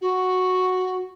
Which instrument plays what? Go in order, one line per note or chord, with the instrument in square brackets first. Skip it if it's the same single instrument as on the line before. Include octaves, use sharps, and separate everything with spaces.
[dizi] F#4